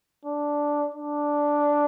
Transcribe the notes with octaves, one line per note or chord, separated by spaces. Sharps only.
D4
D4